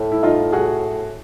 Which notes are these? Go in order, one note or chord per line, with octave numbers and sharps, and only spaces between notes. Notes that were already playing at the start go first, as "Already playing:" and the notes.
Already playing: A2
E4
D#4 F4
F#4 G#4